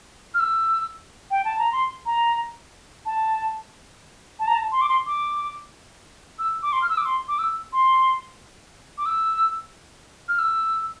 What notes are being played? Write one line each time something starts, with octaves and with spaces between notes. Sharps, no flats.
F6
E6
G5
A5
A#5
C6
A#5
A5
A5
A#5
A5
C6
D6
C6
D6
E6
D6
C6
F6
E6
D6
C6
D6
E6
C6
D6
E6
F6
E6